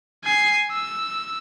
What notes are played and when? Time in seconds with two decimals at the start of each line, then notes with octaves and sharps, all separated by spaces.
0.24 G#5 C7
0.71 E6